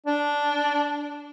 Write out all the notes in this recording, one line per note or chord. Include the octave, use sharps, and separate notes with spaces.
D4